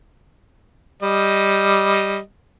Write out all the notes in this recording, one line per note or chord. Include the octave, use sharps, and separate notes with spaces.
G3 D#5